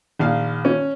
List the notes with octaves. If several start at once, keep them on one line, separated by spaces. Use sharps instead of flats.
A#1 D#3 F5
C#4